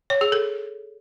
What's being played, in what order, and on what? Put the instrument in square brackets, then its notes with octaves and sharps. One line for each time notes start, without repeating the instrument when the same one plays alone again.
[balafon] C#5
G#4
A4